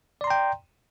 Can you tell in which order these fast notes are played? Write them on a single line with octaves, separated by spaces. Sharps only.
D5 C6 A#5 G5